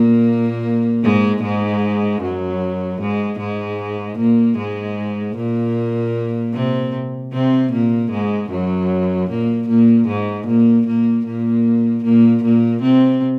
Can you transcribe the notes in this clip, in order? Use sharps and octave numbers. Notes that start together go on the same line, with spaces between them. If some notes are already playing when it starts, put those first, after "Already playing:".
Already playing: A#2 A#3
G#2 G#3
G#2 G#3
F#2 F#3
G#2 G#3
G#2 G#3
A#2 A#3
G#2 G#3
A#2 A#3
C3 C4
C3 C4
A#2 A#3
G#2 G#3
F#2 F#3
A#2 A#3
A#2 A#3
G#2 G#3
A#2 A#3
A#2 A#3
A#2 A#3
A#2 A#3
A#2 A#3
C3 C4